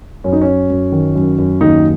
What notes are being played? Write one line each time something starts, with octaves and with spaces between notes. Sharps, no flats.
F#2 C#4
D#4
F#2 C#4
F#2
D#3
F#2
F#2
D#2 D#4